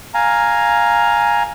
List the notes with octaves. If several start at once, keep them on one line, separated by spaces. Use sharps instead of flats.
F5 G#5 A#5